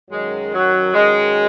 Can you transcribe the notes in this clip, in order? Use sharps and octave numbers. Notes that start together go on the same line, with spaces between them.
F#2 D#3 F#3 G#3
F#3
F#2 D#3 F#3 G#3